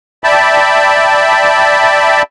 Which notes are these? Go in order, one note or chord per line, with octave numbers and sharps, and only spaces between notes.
D5 E5 G5 A5 B5